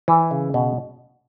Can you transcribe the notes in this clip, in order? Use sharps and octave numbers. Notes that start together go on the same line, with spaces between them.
E3
C#3
B2